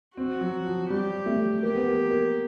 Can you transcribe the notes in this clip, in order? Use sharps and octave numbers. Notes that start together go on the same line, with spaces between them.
C4 F#4
F#3
F3
G3 G4
A3
A#3 G4
B3
A#3
A#3